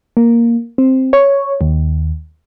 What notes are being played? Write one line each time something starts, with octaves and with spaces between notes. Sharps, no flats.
A#3
C4
C#5
D#2